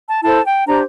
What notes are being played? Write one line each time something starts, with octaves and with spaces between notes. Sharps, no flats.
A5
E4 A4 C5 A5
G5
D4 G4 C5 A#5